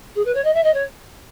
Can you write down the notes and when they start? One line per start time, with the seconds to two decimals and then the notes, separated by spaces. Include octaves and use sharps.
0.15 G#4
0.25 B4
0.34 C#5
0.44 D#5
0.53 E5
0.63 D#5
0.74 C#5